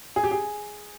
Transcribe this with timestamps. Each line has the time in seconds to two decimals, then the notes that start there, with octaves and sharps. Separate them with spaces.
0.16 G#4
0.23 G4
0.31 G#4